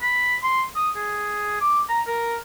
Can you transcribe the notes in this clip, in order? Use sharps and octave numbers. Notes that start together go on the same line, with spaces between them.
B5
C6
D#6
G#4
D6
A#5
A#4